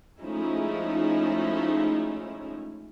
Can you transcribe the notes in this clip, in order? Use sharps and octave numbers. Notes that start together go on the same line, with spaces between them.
F3 G#3 A3 C#4 D#4 E4